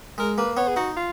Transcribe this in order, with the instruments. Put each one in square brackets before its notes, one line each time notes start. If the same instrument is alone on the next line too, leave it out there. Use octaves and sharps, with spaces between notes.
[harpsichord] G#3 [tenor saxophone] A#4
[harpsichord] A#3 [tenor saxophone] B4
[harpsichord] B3 [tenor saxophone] C#5
[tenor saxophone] G#4
[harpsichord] D#4 [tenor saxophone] F#4
[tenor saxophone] F4